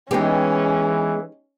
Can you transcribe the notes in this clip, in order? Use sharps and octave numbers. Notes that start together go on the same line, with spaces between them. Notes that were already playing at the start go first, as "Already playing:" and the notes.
E3 G#3 B3 C#4 D#4 G4 G#4